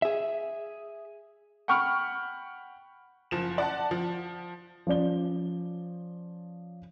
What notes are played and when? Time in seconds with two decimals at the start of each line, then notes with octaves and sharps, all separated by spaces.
0.02 G#4 E5
1.68 F#5 G5 B5 C#6 F6
3.31 F#1 F3 E7
3.58 D5 F#5 A5
3.91 F3
4.87 F3 C#4 D5 G7